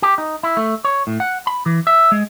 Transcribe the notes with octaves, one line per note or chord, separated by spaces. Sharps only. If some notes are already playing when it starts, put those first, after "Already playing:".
G4
D#4
E4
A3
C#5
A2
F#5
B5
E3
E5
G#3